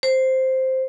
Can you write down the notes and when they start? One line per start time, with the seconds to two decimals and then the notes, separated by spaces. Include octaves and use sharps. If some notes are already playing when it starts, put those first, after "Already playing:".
0.03 C5